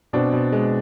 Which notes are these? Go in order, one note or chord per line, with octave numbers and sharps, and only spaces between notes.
B2 C4 D4
B2
G#3